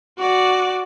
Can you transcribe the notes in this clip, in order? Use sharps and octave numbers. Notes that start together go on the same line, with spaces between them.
F#4 D5